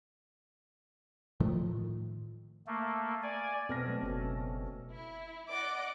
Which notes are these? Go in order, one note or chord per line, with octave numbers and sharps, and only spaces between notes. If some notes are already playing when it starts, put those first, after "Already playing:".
A2 D#3 F3 A3
A3 A#3
D5 G#5
B2 C4 A4 D5 F6 A#6
F#3 A3
F#1 C#4 A4
E4
D5 D#5 F#5 D6